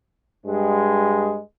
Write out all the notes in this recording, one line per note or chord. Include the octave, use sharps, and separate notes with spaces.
G2 G#3